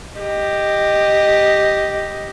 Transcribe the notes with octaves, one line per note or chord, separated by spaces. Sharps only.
G4 D#5